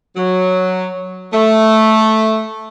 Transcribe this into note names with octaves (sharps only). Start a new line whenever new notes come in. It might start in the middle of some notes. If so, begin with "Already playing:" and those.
F#3
A3